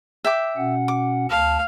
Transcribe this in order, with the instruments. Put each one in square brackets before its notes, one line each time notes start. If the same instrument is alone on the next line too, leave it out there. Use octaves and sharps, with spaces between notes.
[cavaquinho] E5 G5 D6
[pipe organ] B2 C#4 F#5
[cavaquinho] D6
[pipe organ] D2 A5 [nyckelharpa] F5